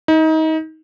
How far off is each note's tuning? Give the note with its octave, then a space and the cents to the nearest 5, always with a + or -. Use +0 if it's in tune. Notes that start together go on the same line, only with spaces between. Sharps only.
D#4 +30